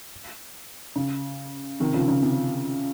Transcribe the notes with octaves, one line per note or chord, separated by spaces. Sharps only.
C#3
C3 D#3
C#3 F3
C#3
C3